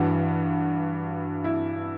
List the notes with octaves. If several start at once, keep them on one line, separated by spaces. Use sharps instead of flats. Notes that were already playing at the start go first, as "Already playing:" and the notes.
Already playing: G2 E3 F#4
E4